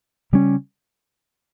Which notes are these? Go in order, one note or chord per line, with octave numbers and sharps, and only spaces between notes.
C#3 G3 C#4